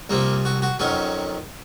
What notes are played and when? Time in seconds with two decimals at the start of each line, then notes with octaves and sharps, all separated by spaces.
0.10 C2 C3 F3 A#3
0.45 F#4
0.62 F#4
0.79 F2 D#3 F#3 C#4